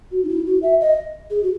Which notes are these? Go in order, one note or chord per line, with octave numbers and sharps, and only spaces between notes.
F#4
D#4
E4
F#4
E5
D#5
G#4
F#4